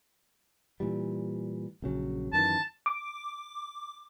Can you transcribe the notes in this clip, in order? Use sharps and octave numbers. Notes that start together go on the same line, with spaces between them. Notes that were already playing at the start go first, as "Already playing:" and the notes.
A#2 E3 G3
A#1 C#3 F#3
F#2 D#3 E3 A5
D6